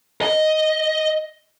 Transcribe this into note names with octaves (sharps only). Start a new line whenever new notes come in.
D#5